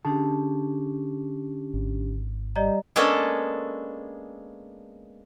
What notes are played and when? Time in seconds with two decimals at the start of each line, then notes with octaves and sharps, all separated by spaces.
0.05 D3 C#4 D4 G4 G#4 A5
1.74 G#1
2.56 G3 G4 D5 D#5 A#5
2.96 G#3 A#3 B3 C#4 D4 A4